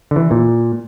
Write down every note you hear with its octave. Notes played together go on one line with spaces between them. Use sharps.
D3
E3
A#2